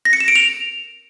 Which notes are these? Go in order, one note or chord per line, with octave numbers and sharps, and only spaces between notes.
A#6
C#7
E7
D7
F7